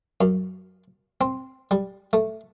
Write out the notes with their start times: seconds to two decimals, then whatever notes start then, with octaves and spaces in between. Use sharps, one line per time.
0.21 F#2
1.21 C4
1.71 G3
2.13 A3